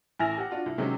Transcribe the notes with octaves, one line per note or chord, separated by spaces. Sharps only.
A1 E4 G#5 F6 A#6 F7
G4 F#5
D4 F4 F#4
C2
C3 D#3 F#3 G#3 C#4